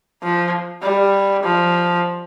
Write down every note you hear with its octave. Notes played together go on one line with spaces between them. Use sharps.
F3
G3
F3